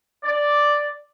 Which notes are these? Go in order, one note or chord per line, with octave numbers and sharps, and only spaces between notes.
D5